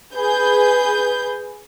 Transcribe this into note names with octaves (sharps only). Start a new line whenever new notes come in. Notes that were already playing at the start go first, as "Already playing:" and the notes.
G#4 B4 G6